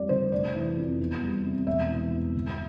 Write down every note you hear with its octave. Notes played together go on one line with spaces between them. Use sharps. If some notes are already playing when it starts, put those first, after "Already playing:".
Already playing: F2 G3 D5
D3 C5
F1 D5
E3
F2
E2
G3
C3
E1 E5
E3
E2
G1